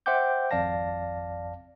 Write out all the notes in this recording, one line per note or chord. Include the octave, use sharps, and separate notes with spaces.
C5 E5 F#5 G5 D6 G6
G#1 F2 D5 F5 A5 A#6